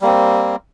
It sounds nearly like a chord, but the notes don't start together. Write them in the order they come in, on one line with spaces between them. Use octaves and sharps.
G3 A#3 C4